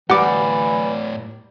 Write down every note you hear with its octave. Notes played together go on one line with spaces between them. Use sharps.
A2 E3 G3 D5 F#5 D6